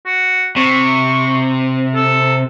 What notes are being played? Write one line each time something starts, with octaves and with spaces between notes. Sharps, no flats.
F#4
C3 C#6
A4